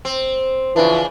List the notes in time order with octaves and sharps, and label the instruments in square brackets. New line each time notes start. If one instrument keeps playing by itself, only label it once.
[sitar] C4
[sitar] C#3 D4 [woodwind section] E3 F3